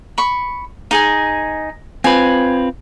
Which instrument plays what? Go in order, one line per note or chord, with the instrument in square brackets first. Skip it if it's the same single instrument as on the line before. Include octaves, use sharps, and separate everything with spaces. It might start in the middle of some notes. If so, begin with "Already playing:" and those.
[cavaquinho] B5 C#6
D#4 G#4 G#5
[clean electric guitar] C4 F4 B4 [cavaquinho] G#5